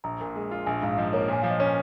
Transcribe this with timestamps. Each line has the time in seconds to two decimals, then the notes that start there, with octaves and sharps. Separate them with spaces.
0.04 A#1 A#5
0.21 A#2
0.36 G#3
0.51 F4
0.66 A#1 G#5
0.82 G#2 F5
0.92 F5
0.98 F3 D#5
1.13 A#3 C#5
1.28 A#2 G#5
1.42 F3 F5
1.50 D#5
1.60 C#4 C#5